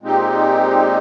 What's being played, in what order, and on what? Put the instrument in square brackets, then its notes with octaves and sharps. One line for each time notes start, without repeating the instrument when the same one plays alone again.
[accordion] A#2 G#3 C4 D#4 G4